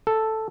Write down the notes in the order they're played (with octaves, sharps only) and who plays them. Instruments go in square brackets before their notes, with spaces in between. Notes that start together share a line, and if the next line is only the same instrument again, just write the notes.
[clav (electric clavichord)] A4